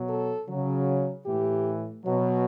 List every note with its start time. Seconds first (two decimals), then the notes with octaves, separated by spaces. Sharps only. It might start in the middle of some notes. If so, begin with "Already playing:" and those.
Already playing: B2 F#3
0.10 A4
0.49 C#3 F#3
1.26 A2 E3 G4
2.04 B2 F#3